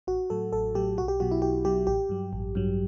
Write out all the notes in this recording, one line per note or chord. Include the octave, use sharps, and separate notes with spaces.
A1 F#4
A2 F#3 A4
A1 A4
A2 F#3 G4
B1 F#4
G4
B2 F#3 F#4
E4
B1 G4
B2 F#3 G4
A1 G4
G2 F#3
A1
G2 F#3